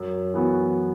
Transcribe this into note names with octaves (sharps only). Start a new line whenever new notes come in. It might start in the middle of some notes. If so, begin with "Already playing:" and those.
Already playing: F#2
E3 B3 F#4